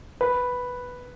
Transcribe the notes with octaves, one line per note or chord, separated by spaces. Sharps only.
B4